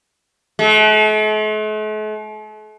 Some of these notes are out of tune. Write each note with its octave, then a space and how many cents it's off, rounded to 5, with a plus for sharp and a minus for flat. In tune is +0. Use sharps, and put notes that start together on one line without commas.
A3 -45